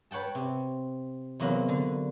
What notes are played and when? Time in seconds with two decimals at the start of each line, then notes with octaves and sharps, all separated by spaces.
0.11 B4 C#5 F#5 G5 A5
0.35 C3
1.40 E2 C3 F#3 A#3 B3 F#4
1.68 D3